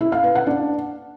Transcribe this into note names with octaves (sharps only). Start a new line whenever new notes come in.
E4
F5
B4
F#5
D4